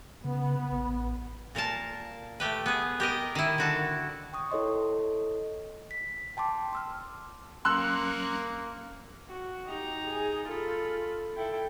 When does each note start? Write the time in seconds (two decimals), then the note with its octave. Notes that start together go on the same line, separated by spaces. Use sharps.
0.25 C#3 B3
0.71 A1
1.55 A#2 A#4 F5 A5
2.40 A3 G4 B4
2.66 B3 G#4
3.00 G4 A#4 D#5
3.35 D#3 E4
3.58 D3 F#4 A5
4.33 G5 C#6 D#6
4.51 E4 A4 C#5 D#5 C6
5.91 B6
6.37 G5 A5 C6 D6
6.73 C6 E6 F6
7.65 F#3 A#3 C#4 C6 E6 F#6
9.29 F#4
9.66 D#4 G4 A#5
10.06 G#4
10.47 F4 A4 B5
11.36 E4 A4 G5